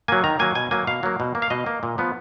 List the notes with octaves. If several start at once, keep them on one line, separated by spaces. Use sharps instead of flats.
F#3 A#3 G#5
D#3 A#5
F#3 A#3 G#5
B2 G#5
F#3 A#3 G#5
B2 F5
F#3 A#3
B2
A#3
F5
B2 D#5
A#3
A#2
F3 B3